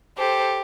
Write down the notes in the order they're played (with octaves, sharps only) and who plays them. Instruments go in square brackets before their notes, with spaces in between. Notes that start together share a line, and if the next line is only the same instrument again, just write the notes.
[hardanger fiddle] G4 [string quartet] A4 C5